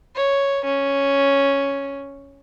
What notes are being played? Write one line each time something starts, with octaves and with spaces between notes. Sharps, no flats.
C#5
C#4